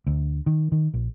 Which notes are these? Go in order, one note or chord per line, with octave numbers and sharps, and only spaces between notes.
D2
D#3
D#3
A#1